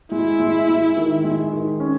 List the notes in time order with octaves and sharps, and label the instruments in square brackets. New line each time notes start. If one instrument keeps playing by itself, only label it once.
[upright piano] G#3 [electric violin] E4
[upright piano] G#3
G#3
D#3
G#3
D#3
C#4